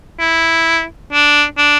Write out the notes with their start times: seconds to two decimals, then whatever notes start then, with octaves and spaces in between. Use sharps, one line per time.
0.19 E4
1.12 D4
1.58 D4